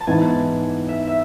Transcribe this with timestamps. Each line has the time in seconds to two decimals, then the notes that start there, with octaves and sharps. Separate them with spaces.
0.01 A5
0.07 G#2 E3 B3 G#5
0.89 E5
1.08 E5